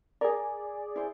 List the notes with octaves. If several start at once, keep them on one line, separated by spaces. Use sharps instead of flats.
G#4 A#4 D5
E4 C5